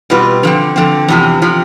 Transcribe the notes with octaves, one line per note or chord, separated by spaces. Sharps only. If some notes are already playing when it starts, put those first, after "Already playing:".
B2 G3 C4 F4 B4
D3 F3 C4
D3 F3 C4
E2 C3 F3
C3 F3